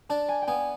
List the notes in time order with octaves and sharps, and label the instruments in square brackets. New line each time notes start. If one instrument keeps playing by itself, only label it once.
[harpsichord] D4 [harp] A5
[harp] G#5
G5
[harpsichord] B3 [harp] G#5